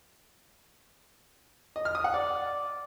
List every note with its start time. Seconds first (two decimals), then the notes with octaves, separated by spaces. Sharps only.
1.76 D#5
1.85 F6
1.95 D#6
2.04 F#5
2.14 D5